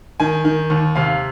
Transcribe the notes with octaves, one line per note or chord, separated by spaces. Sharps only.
D#3 G#5
D#3
D#2
C3 F5